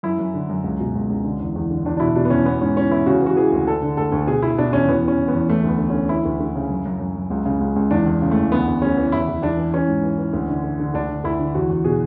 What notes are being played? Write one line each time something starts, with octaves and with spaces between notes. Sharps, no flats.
F#2 E4
F#2
D3
F#2
C#2
B2
C#2
C#2
D3
E2
E2
D3
E2 D4
D4
B2 E4
B2 D4
B3
E2 C#4
E3 B3
G#2 C#4
E3 C#4
E3 E4
C#3 F#4
E3 F#4
E3 G#4
D2
D3 A4
D3
D2 A4
D2
B2 G#4
B2 E4
B2 D4
E2 C#4
E2 B3
E3 C#4
E2
B3
E2
E3 A3
D2
B3
D2
C#4
D2
E3 E4
D2
D2
C#3
F#2
F#2
F#2
F#2
C#2
C#3
C#2
C#2
E2 D4
E2
C#3
E2 A3
D2 B3
D2
D2 C#4
E3
E2 E4
E2
E2 D4
E3
E3 C#4
G#2
E3
E3
D2
D3
D3
D3
D2 D4
D3
D2 E4
D3
E2 F#4
E2
B2 G#4